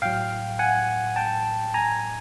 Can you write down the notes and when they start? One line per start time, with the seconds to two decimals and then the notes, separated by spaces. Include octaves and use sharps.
0.02 A2 F#3 F5 G5
0.59 F#5 G#5
1.16 G5 A5
1.74 G#5 A#5